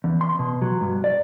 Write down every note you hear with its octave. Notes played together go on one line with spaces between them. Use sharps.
E2
C6
B2
F#3
G2
D5